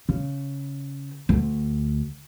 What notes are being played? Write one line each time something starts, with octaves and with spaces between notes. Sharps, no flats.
C#3
D2